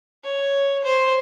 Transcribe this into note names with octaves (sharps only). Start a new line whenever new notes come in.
C#5
C5